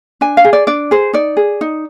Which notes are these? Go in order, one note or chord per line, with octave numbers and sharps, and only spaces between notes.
D4 G#5
F5
G#4
D5
D4 D5
G#4 C5
D#4 D5
G#4
D#4